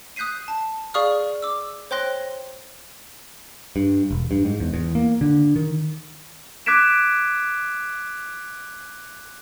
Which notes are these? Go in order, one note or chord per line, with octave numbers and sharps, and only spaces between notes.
D#6 F#6 G6 B6 C7 D#7
A5
G#4 D5 F5 C#6 D#6 F6
D6 E6
C5 C#5 G5 C6 F#6 A#6
G2
E1
G2
G#2
E2
E2
A#3
D3
D#3
D6 F#6 G#6 B6 D7 E7